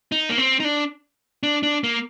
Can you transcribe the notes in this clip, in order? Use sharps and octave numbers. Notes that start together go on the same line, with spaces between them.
D#4
A#3
C4
D#4
D4
D4
D4
A#3